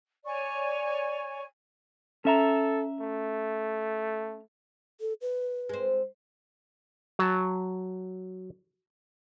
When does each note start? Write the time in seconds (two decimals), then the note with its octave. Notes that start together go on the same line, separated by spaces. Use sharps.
0.25 C#5 D5 G#5 C#6
2.25 C#4 A4 E5 A#5
3.00 A3
5.00 A4
5.21 B4
5.69 G#3 C4
7.19 F#3 A5